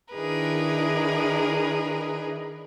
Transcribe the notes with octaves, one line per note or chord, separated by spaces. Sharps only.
D#3 D4 E4 G#4 A#4 B4